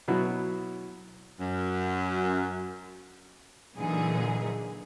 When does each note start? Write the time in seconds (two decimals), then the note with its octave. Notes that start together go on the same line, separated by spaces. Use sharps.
0.08 B2 F#3 B3 E4
1.39 F#2
3.77 A#2 D3 E3 F#3 D#4 G#4